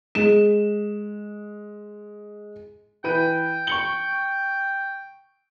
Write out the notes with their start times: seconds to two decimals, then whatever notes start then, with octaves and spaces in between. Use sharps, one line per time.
0.15 G#3 E7
3.04 E3 B4 G5 D#7
3.67 C#6 C#7 G7